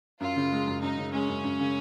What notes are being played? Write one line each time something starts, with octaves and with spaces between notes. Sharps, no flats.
F#2 F4
C#3
G#3
F#2
F#2 D#4
C#3
G#3 C#4
F#2
F#2
C#3